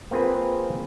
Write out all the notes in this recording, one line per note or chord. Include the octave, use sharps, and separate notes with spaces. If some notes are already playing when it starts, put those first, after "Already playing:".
A#3 C4 F4 G#4 B4